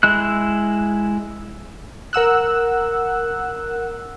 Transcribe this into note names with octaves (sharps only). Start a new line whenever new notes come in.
G#3 E4 F#6
A#4 F#5 E6 F#6